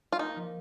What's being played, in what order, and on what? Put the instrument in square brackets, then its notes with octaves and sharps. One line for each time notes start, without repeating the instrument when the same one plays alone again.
[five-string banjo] F4
[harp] A#3 [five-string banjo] D#4
[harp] F3